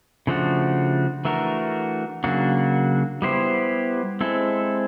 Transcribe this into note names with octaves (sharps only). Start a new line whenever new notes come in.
C#3 F3 A3 D4 F#4
E3 A3 D4 F#4 A#4
C#3 F#3 A#3 D4 F#4
G3 B3 E4 G4 C5
G#3 C4 E4 A4